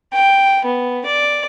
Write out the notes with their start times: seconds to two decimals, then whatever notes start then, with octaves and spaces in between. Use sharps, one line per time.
0.13 G5
0.65 B3
1.06 D5